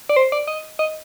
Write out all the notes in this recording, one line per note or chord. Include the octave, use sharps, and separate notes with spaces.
D5
C5
D5
D#5
D#5